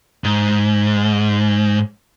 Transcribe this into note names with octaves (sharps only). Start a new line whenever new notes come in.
G#2